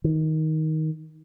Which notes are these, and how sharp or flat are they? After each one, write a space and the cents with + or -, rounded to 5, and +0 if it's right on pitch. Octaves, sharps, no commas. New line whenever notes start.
D#3 +15